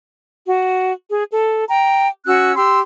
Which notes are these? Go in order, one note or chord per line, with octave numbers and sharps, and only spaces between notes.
F#4
G#4
A4
G5 A#5
C#4 F#4 E6 F#6
G4 C6 E6